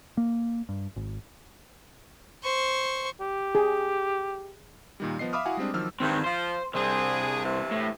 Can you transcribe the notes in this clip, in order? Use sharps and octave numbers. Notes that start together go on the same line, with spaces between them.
A#3
G2
G#1
C5 C#6
G4
G#4
A#2 D#3 G3
F3 B3 D#5 C7
E5 F5 B5 D6 D#6 F6
E4 F#4 F5 F#5 G#5
G3 G#3 C4 D4
D#3 F3 F#3 E6 F6
G2 D#3 C4
F3 C5
C2 C4 D4 G#4
G2 C3 E3
A2